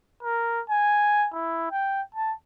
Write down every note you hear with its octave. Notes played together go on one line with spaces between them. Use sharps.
A#4
G#5
E4
G5
A5